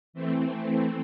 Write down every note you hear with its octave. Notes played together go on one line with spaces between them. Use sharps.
E3 A3 C4